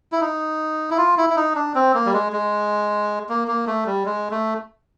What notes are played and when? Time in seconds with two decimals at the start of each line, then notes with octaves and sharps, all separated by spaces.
0.12 E4
0.21 D#4
0.90 E4
0.98 F4
1.17 E4
1.30 E4
1.36 D#4
1.55 D4
1.75 C4
1.94 A#3
2.06 G3
2.13 G#3
2.32 G#3
3.29 A#3
3.48 A#3
3.67 A3
3.86 G3
4.05 G#3
4.31 A3